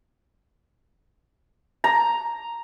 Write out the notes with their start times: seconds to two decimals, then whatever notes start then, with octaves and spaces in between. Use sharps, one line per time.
1.84 A#5